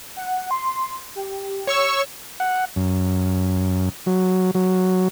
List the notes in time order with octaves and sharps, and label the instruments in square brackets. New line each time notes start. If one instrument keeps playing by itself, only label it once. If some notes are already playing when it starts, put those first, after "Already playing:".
[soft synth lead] F#5
C6
G4
[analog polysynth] C#5 C#6 E6
[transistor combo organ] F#5
F#2
F#3
F#3